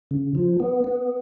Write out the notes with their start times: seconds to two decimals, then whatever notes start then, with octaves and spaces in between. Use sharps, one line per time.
0.11 C#3
0.35 F3
0.60 B3
0.84 B3